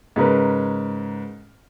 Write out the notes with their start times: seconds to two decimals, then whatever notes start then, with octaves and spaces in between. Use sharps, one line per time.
0.16 G#2 C#3 A#4 B4